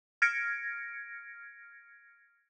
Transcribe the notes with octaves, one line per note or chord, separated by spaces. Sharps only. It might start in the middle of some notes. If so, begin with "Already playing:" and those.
F6 G#6 A#6 C#7 D7